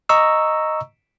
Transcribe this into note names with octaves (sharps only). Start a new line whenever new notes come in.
D#5 A#5 C#6 E6